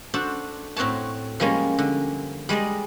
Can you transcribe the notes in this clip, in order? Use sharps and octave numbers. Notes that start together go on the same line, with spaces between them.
D4 F#4 A4 C5
A2 C4 F#4 C#5 A5
F3 G3 G#3 A#3 C#4
D3
G3 G#3 D5 D#5